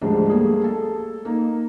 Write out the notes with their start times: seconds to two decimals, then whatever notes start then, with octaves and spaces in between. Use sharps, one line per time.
0.01 D2 G#2 F3 G3 G#3 D4
0.30 G3 A3 A#3 G#4
0.64 A4
1.25 A#3 D#4